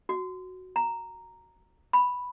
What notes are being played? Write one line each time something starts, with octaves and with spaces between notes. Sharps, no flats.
F#4
A#5
B5